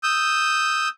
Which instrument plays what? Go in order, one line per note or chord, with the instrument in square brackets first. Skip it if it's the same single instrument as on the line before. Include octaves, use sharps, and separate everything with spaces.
[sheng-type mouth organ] D#6 E6 G6